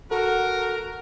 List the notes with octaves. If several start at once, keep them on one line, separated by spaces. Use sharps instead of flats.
F#4 A4 A#4